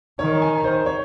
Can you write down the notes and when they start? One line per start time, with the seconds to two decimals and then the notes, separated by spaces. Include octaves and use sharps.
0.19 D#3 C#5
0.42 G#5
0.64 C5
0.86 C#5